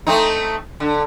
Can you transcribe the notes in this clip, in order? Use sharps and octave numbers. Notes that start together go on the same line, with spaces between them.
A3 C4 D#4
D3